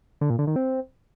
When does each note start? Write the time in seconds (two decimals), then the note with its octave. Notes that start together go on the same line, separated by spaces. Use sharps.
0.21 D3
0.30 A#2
0.39 D3
0.47 D#3
0.56 C4